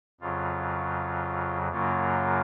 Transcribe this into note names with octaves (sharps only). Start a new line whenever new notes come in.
F2 C#3 F#3 F4
F#2 C#3 F#3 A#3 F4